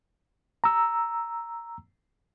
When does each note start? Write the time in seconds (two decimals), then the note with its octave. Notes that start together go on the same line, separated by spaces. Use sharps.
0.64 A#5 E6